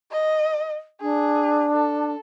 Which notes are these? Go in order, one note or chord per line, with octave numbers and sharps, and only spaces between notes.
D#5
D4 G#4
A4